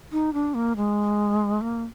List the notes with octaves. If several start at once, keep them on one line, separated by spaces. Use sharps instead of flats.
D#4
D4
A#3
G#3
A#3